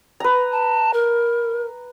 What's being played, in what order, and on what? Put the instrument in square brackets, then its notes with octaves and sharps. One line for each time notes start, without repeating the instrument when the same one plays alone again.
[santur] B4 A#5
[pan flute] A5
A#4